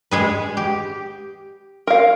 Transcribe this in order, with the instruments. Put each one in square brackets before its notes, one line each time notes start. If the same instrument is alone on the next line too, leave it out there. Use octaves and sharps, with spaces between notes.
[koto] G#3 G#4 B4
G4
[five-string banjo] A#4 F5